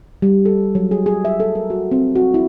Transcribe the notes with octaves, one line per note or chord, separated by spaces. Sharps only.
G3
A4
F#3
G#4
G#4
E5
A4
A#4
F#4
C4
F#4
E4